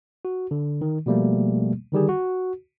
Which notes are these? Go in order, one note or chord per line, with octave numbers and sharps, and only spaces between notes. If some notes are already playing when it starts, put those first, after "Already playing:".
F#4
D3
D#3
B2 F3 G3 A3 A#3
D3 D#3 G3 G4 G#4
F#4